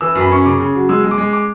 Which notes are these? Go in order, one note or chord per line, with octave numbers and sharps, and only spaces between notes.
E3 E6
F#2
B5
C#4 C#6
C#3 D6
C#3
F#3
G#3 E6
G#3
D6
G#3
D6